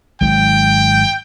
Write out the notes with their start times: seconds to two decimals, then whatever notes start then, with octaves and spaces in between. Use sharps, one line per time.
0.21 G#1 G#2 F#3 G5